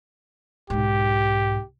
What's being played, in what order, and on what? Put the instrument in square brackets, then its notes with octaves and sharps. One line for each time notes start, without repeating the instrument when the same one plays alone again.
[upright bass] B1 G#2 [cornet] G4